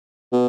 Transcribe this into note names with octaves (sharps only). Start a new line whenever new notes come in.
B2